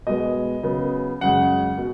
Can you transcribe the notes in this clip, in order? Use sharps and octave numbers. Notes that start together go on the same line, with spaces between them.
B2 G#3 B3 D#5
C#3 F#3 B3
F#2 C#3 G#3 F#5
B2